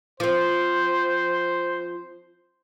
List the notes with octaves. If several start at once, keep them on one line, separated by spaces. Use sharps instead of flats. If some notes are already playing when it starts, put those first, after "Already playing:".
F3 C4 C5